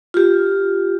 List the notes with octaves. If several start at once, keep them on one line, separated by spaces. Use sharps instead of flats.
F4 G4